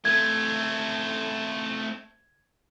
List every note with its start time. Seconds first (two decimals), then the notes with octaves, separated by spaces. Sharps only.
0.05 A3 C4 G#6